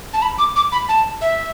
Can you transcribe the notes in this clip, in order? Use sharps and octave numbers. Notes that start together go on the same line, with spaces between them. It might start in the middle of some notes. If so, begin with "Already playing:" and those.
A5
B5
D6
D6
B5
A5
E5